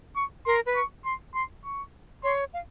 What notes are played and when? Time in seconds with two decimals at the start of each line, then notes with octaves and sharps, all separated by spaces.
0.16 C#6
0.46 A#4 C6
0.66 B4
0.76 C#6
1.05 C6
1.35 C6
1.64 C#6
2.24 C#5 C6
2.53 F5